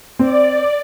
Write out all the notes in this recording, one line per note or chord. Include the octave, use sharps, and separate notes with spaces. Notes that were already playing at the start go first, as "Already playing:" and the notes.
C4 D5